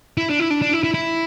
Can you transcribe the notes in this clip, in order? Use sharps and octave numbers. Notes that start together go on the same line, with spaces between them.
E4
D4
E4
D4
D4
E4
E4
E4